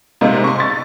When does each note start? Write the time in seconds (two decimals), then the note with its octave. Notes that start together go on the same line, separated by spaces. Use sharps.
0.21 C3 G#3 A#3 D#4
0.44 C6 C#6
0.60 A6